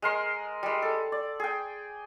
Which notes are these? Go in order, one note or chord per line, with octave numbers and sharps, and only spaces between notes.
G#3 A#4 C6
G3 G#3
A4
D5
G#4 G5